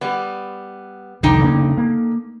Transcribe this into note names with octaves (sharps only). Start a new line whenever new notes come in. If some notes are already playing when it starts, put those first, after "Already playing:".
G3 B3
C2 F2 D3 D#3 D#4 G5
C#3 A#3 D4
A#3